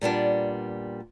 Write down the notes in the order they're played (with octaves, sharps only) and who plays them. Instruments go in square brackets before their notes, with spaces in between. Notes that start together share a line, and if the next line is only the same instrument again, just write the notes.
[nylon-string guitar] A#2 G3 B3 D4